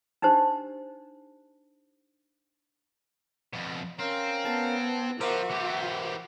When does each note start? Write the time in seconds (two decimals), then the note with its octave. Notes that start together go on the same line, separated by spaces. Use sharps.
0.22 D4 D#4 G4 C5
3.53 F2 B2
3.99 C4 C#4 A#4 F5
4.45 B3 A5
5.21 F3 F#4 A#4 C5 E5 D6
5.51 E3 G4